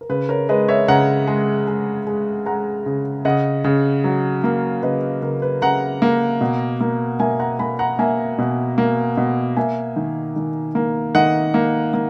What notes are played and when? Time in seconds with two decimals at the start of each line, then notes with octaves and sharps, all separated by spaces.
0.01 A#4
0.09 C#3 B4
0.29 A#4 C#5
0.49 G#3 B4 D#5
0.68 C#5 E5
0.88 C#3 F#5 A#5
1.27 G#3
1.67 G#3
2.07 G#3
2.46 G#3 F#5 A#5
2.86 C#3
3.25 C#3 D#5 F#5
3.64 C#3
4.04 F#3
4.44 A#3
4.83 C#3 B4 D#5
5.22 C#3 A#4
5.42 B4
5.62 C#3 F#5 A#5
6.02 A#3
6.41 B2
6.80 A#3
7.20 A#3 E5 G#5
7.40 F#5 A#5
7.59 A#3 G#5 B5
7.79 F#5 A#5
7.99 A#3 E5 G#5
8.38 B2
8.78 A#3
9.17 B2
9.57 A#3 E5 G#5
9.96 D#3
10.36 D#3
10.75 A#3
11.15 D#3 D#5 F#5
11.54 A#3
11.94 A#3